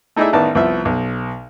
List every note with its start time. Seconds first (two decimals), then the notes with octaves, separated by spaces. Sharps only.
0.16 A3 D#4 E4 G#4 D5 E5
0.33 A1 D#3 B3 D5 A5
0.55 C2 F3 B3 E5
0.85 B1